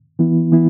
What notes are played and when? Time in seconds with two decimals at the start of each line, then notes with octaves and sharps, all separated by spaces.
0.19 E3 B3 E4
0.51 E3 B3 E4